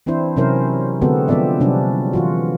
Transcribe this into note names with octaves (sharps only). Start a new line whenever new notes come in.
E3 C4 D4 E4 C5
C3 F#3 C#4 E4 A#4 C5
D3 G#3 B3 C4 F#4 A4
F3 B3 C4 F4 D5 E5
C3 F#3 G3 C#4 D4
E3 F4 F#4